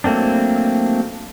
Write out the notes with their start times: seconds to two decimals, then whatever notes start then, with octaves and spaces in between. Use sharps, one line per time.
0.04 F#3 A3 A#3 C4 D4